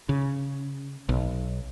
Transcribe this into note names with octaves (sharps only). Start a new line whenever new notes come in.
C#3
B1